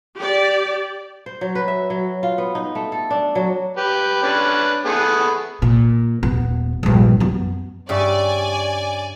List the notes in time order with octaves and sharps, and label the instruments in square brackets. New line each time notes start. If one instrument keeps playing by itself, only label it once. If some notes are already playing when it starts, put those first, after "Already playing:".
[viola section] G4 D5
[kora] C5
F#3
B4
E5
F#3
F4
B3
D#4
A3
A4
D4
F#3
[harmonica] G4 B4
C#4 D4 B4
A3 B3 G#4
[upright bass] A#2
D#1 B3
A#1 G2
F#2 B3
[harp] G2 E5 C#6 [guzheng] C#3 G3 [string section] D5 G#5